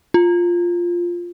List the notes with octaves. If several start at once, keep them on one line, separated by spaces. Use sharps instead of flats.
F4